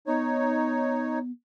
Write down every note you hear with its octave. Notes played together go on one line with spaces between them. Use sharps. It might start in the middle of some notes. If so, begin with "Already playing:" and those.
B3 D#4 C#5